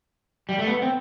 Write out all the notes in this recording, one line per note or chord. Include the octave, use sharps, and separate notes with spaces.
G3
A3
B3
C4